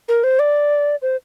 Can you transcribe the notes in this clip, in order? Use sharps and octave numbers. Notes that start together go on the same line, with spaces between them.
A#4
C5
D5
C5